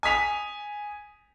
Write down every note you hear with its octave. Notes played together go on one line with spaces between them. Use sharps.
G#5 D#6 B6 F7